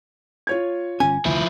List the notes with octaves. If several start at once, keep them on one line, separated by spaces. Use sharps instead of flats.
F4 C#5 G#6
G1 C#4 G#5
F1 D2 F3 E4